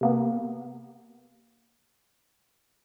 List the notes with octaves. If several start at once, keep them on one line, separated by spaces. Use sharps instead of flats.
C3 A#3 B3